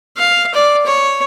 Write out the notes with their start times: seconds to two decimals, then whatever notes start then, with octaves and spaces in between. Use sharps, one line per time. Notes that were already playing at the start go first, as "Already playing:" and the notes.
0.17 F5
0.54 D5
0.86 C#5